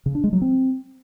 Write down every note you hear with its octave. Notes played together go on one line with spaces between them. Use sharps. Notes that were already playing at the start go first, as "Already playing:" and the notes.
C#3
D4
G#3
F#3
C4